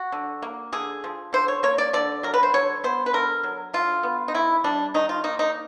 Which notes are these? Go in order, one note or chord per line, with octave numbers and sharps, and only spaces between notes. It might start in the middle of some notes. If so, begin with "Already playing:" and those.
Already playing: F#4
D3
A#3
D3 G#4
F3
D3 C5
C#5
A#3 C#5
D5
D3 D5
F#3 A#4
B4
C5
D3 C#5
B3 C5
B4
D3 A#4
F#3
D3 F4
B3
D#4
D#3 E4
G3 D4
D#3 D#4
F4
A#3 D#4
D#4